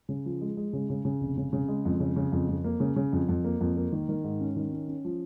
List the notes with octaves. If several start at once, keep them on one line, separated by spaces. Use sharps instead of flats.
C#3
F3
G#3
G#3
C#3
C#3
C#3
F1
C#3
C#3
G#3
F2
C#3
C#3
F2
F2
A#3
C#3
C#3
F2
F2
A#3
F2
A#3
D#3
D#3
G#2
C#4
D#3
C#4
C#4
F3